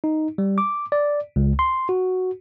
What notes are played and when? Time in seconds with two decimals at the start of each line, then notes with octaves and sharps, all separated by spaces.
0.04 D#4
0.38 G3
0.58 D6
0.92 D5
1.36 C#2
1.59 C6
1.89 F#4